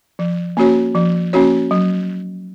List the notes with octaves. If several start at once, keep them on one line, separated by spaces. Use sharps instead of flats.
F3
A#3 C#4 F#4 C#5
F3
A#3 C#4 F#4 C#5
F#3